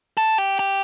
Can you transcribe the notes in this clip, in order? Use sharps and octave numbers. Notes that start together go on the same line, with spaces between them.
A4
G4
G4